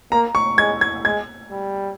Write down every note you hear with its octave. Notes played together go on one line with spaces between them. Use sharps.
A#3 A#5
C#6
G#3 G#6
G#6
G#3 G#6
G3